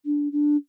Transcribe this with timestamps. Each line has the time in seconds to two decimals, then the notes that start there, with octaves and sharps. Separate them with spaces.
0.05 D4
0.32 D4